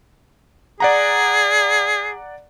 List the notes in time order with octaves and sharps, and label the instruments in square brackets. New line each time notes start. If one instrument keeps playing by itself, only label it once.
[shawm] G#4 [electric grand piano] D5 F#5 A#5